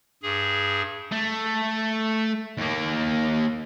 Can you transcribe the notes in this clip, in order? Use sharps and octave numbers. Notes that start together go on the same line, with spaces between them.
G2 G#4
A3
D#2 A#3